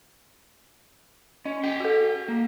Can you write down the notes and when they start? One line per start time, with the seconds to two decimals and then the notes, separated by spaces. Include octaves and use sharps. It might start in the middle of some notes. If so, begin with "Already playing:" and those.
1.45 C#4 D#5
1.63 G#4 G5
1.80 F#4 A4
2.28 A#3